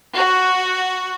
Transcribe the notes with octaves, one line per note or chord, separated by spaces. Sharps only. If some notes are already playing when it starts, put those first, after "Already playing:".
F#4